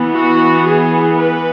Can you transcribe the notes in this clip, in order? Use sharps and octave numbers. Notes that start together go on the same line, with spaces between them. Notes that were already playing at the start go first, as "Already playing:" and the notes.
Already playing: E3 B3
F#4
G#4
B4